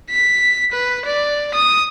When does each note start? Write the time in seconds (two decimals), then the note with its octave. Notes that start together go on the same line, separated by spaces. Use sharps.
0.10 B6
0.72 B4
1.06 D5
1.54 D#6